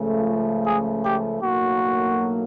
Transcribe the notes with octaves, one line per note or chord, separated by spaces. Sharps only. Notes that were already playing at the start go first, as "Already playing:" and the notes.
Already playing: C#2 C#3 F3 A3
G#4
G4
B1 A2 F#3 A#3 F#4